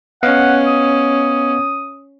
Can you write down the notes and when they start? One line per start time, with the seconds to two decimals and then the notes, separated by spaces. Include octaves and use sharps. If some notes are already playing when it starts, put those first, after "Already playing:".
0.23 B3 C#4 D#5 F5 F#5
0.67 D#6